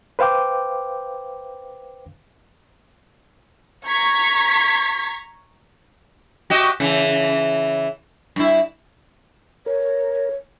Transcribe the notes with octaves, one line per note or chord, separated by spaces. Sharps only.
B4 C5 F5 G5 D6
A#5 C#6 G#6 B6
F#4 G4 D#5
C#3 E3
G2 E4
A#4 C#5